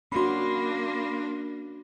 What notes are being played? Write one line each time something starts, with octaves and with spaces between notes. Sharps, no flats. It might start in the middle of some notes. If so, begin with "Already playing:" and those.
A#3 C#4 D4 F#4 B5 C6